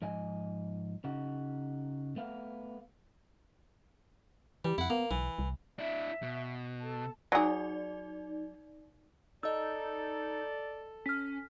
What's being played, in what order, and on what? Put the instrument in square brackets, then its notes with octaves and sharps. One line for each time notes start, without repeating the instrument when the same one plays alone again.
[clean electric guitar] G#2 F3 D#5 G#5
C#3 D#4 F#4
A3 B3 F5
[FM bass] E3 [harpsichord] G3
[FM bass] F2 [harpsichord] E4 F#5
[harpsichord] A#3 [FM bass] B3
[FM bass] B1 [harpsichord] E3
[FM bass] C2
[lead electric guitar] D4 E4 [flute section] E5
[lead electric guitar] B2
[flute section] A4 A5
[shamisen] F#3 G#4 [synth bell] D#4 D5
[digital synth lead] D#4 [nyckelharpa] A4 [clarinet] D5 [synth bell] D#5 E6
[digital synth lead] C#4 [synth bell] F6 B6